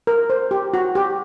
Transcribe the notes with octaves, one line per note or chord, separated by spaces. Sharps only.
A#4
C5
G4
F#4
G4